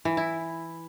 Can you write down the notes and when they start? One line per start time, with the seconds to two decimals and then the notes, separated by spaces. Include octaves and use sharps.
0.05 E3
0.17 E4